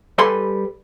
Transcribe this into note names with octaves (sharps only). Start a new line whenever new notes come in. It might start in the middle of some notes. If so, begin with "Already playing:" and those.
G3 G4 A4 B4 G#5 C6